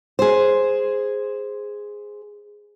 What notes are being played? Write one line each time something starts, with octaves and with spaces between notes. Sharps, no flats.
G#4 C5